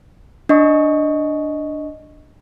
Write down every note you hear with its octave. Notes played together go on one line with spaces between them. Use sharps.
D4 D#5 C#6